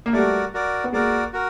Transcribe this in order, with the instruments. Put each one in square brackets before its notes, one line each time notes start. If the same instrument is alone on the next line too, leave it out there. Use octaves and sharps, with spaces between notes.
[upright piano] A#3
[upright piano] G3 A3 [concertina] F#4 A#4 D5
[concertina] F#4 A#4 D5
[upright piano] B3
[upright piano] G#3 A#3 [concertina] F#4 A#4 D5
[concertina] F#4 A#4